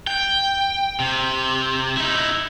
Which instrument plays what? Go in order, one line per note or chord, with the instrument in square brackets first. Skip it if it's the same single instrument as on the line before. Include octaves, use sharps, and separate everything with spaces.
[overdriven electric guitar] G5
C3
D#4 E4